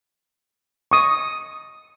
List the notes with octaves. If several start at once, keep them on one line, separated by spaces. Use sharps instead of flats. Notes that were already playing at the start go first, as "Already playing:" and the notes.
C#6 D#6